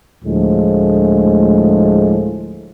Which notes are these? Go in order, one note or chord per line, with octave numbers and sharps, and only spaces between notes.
D2 A2 F3 G#3